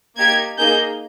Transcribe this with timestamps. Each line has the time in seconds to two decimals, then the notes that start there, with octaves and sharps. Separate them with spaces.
0.17 A#3 D#4 G4 G#6
0.58 A#3 D#4 G#4 G6